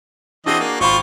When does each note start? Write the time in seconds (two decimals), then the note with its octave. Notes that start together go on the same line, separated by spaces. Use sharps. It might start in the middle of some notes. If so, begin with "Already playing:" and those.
0.46 E3 C4 D4 F#4 G#4 D#5
0.60 A#3
0.80 G#1 F4 C5 B5 C#6